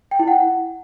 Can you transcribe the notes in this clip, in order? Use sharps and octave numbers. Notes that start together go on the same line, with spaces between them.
G5
E4
F#5